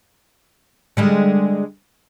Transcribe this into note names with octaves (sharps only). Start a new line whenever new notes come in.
D3 G3 G#3